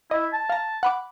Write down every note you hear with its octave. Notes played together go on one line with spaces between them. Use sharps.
E4 D#5
A5
F5 A#5
F#5 B5 D6